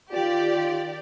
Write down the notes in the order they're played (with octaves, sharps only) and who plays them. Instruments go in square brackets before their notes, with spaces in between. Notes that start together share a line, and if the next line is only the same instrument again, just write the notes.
[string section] D#3 G4 D5 [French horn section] F4